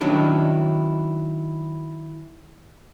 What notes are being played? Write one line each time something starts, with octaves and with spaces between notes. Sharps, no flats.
D#3 F#3 C#4 D4 E4